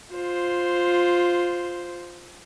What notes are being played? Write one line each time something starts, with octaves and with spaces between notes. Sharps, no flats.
F4 C5